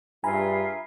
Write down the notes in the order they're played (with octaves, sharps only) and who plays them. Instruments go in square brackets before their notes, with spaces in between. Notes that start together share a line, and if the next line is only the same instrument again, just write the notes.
[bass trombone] G2 [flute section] F4 G#4 E5 [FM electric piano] G#5 A#5 B5